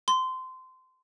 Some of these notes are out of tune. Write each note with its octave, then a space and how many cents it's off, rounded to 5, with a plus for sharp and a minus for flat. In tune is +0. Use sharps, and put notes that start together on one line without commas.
C6 -20